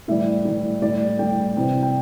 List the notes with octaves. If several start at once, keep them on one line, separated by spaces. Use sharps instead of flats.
A2 E3 G3 E5
A2 E3 G3
A2 G3 D5
A2 G3 G5
C3 E3 G3
G5